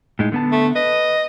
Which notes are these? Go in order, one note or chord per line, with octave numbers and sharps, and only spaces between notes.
A2 G#3 D#4
D3 B3 A5
A3
B4 D#5